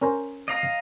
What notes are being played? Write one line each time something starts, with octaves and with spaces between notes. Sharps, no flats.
C#4 A#4 C5
D#5 F5 A#5